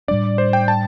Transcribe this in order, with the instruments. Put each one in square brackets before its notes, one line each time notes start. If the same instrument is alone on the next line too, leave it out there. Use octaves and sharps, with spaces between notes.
[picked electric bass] A2 G3 D4 [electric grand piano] D5
[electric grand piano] C5
G5
A5